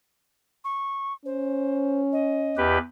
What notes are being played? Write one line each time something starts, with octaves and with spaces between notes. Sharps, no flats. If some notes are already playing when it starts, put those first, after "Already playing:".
C#6
C#4 C5
D#5
E2 G4 B4